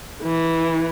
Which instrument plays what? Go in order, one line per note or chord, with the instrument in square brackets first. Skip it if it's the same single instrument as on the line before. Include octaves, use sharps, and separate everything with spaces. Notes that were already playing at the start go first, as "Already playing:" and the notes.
[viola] E3